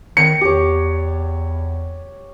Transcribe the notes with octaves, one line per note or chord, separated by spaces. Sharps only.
D#3 C#7
E2 G4 C#5